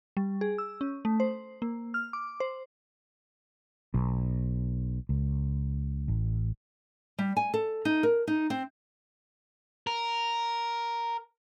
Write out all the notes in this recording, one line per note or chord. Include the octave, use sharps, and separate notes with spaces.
G3
G#4
E6
C#4
A3
C5
A#3
F6
D6
C5
B1
C#2
A1
G3
G#5
A4
D#4
A#4
D#4
C4
A#4